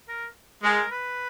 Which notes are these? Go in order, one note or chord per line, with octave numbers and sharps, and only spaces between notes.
A#4
G#3 A#4
B4